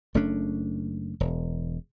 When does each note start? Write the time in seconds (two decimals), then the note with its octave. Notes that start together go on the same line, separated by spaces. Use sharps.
0.14 F#1 A3 C#4 D4
1.20 E1